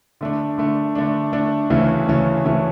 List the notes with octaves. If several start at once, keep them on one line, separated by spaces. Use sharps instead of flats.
D3 A3 D4
D3 A3 D4
D3 A3 D4
D3 A3 D4
D2 C#3 E3 A3 C#4
D2 C#3 E3 A3 C#4
D2 C#3 E3 A3 C#4